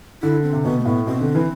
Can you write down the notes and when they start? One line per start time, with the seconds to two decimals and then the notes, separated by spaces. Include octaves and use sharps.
0.22 D3 E4
0.43 C4
0.53 C3
0.64 B2 B3
0.79 A3
0.85 A2 B3
1.06 B2 C4
1.20 D3
1.35 E3